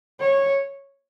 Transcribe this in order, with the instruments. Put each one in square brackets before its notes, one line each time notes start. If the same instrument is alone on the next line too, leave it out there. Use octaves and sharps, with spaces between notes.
[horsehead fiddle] C#5